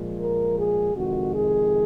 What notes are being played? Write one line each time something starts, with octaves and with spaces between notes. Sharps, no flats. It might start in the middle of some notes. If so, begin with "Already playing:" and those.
Already playing: A#2 F3 G#3
A#4
G#4
F2 C3 D#3 G#3 F#4
G#4